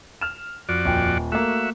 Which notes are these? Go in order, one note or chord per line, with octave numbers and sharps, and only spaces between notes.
F6 E7
F2 F#4 D5
D#1 G5
A3 A#3 F#4 E5